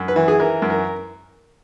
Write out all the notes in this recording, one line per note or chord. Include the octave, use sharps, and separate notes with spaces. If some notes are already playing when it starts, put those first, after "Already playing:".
Already playing: F#2
B4
E3
G#4
E3 A#4
F#2
A#4